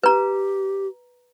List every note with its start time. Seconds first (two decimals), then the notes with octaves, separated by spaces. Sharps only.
0.03 G4 B4 A#5